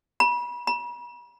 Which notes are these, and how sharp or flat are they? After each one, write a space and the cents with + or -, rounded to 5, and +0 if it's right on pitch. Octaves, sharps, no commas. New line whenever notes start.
B5 -35
B5 -45